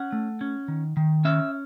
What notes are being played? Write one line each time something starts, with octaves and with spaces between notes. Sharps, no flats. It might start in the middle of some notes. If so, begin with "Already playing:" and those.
Already playing: C#4 F#5
A3
C#4
D#3
D#3
C#4 E5